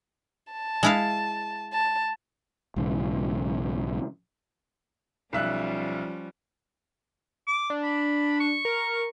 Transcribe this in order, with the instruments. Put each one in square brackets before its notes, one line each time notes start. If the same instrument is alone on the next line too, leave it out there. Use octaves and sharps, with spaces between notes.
[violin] A5
[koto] G#3 E4 F5
[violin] A5
[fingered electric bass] B1 G#2 C#3 E3
[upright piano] B1 E5 F#6 [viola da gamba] F3 G3 C#4
[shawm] D6
[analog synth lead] D4
[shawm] B5
C#6
[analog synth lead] A#4